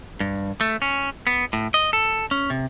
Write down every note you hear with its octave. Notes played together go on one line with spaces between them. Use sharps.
G2
A3
C#4
B3
A2
D#5
A4
C#4
C3